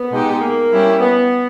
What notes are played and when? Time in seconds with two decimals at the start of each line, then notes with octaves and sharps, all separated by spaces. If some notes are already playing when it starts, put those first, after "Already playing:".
Already playing: B3
0.11 B2 G#3 D#4 G4
0.41 A#3
0.70 G3 C#4 E4 G4
1.01 B3